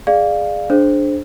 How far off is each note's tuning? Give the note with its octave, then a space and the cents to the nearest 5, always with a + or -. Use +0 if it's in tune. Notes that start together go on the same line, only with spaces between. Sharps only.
G#4 +0 D5 +25 F5 +0
D4 +0 G#4 +35 C5 +5